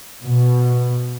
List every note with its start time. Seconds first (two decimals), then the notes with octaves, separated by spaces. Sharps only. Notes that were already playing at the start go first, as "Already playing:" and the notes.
0.23 B2